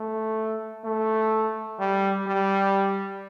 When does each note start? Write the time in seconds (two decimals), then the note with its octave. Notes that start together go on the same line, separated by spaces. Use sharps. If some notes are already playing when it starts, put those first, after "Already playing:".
Already playing: A3
0.85 A3
1.79 G3
2.27 G3